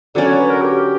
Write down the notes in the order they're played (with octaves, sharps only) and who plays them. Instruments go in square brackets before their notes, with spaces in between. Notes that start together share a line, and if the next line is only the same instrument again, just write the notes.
[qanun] D3 F#3 C#4 F#4 [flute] D5
[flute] C#5
B4
A#4
G4